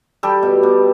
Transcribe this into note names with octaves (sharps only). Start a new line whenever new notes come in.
G3 G4 A4
B2
B2